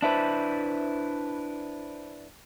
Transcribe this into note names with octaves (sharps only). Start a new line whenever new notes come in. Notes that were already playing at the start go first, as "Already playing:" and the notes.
D4 E4 B4 C5 E5 A5